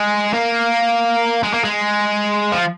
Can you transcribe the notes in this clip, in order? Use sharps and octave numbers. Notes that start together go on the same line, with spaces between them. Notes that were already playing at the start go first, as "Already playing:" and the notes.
Already playing: G#3
A#3
G#3
A#3
G#3
F3